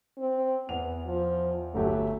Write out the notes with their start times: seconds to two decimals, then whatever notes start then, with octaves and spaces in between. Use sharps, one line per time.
0.18 C4
0.69 E2 B3 F7
1.06 F3
1.74 G1 F#3 A3 G4